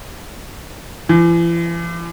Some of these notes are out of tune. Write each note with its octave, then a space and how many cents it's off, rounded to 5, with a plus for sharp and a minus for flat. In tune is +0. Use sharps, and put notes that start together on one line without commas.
E3 +45